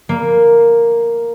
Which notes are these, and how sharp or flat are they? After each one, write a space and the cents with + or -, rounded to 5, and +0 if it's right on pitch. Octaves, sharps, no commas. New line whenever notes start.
A#3 +0